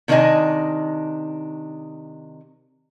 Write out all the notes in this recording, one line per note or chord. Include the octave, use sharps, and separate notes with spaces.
C3 D#3 D4 D#4 D#5 G#5